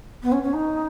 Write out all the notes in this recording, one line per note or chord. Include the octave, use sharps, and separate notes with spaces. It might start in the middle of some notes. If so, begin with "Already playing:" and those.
B3
C#4
C#4
D#4